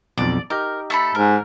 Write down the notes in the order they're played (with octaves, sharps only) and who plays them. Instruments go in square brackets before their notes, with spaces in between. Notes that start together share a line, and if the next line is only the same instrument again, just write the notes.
[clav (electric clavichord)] B1 F2 [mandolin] D5
[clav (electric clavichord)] D#4 G4 D#5 [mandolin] A#4
[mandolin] A3 A4 B5
[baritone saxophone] G#2 [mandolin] A#4